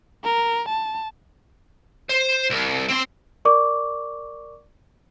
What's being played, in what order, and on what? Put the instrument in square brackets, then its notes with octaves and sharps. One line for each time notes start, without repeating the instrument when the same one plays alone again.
[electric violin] A#4
A5
[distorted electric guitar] C5
C2
C4 C6
[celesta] A#4 D5 C#6 D6